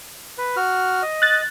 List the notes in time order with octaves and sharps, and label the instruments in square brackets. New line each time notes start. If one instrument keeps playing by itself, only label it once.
[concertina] B4
F#4 F6
D#5
[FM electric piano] F#6 A6